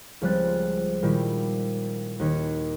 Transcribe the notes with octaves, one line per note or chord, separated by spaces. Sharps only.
C#2 F3 G3 C4 F#6 A6
A#2 D#3 G3 E4
D#2 D#3 G#6 C#7